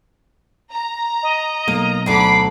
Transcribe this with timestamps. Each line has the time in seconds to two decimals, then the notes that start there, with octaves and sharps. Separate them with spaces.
0.71 A#5
1.23 D#5
1.68 B1 A#3
2.06 D2 D3 F#3 B5 D6 C7